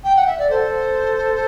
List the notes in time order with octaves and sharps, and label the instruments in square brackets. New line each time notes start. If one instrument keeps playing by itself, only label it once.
[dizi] G5
F#5
E5
D5
[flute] A4 [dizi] C5